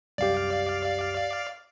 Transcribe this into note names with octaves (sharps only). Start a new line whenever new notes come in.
C2 F#2 G4 D5 F5